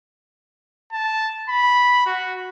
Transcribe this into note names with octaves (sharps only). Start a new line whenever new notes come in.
A5
B5
F#4